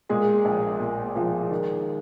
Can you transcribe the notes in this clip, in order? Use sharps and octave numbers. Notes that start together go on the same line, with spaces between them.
A#2 G#3 G#4
A#1
A#2
F3
D#3